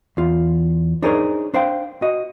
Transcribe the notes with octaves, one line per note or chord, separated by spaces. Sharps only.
E2 F4
D4 D#4 G#4 A#4 C5 C#5
D4 C5 F5 G5
F#4 D#5